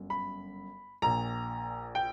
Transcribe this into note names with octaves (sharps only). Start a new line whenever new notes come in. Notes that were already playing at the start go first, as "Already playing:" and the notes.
Already playing: G1 F#2
B5
A#1 A#2 A#5
G5